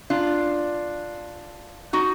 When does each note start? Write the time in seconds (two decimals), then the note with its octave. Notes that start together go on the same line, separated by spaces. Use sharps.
0.10 D4 F4
1.93 D#4 F#4